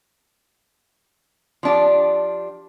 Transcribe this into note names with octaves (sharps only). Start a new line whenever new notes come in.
F3 D4 G4